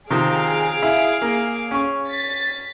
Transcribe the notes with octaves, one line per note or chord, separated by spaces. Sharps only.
C3 D#3 F3 G#4 F5 D7
E4
A#3
C#4 C#6
A6 B6